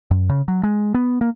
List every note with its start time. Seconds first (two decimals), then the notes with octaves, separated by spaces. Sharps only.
0.11 F#2
0.29 C#3
0.48 F#3
0.63 G#3
0.94 B3
1.21 A#3